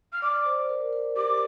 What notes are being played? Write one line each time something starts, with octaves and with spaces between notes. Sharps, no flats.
F6
D5 D6
C5
A#4
A#4
G4 D6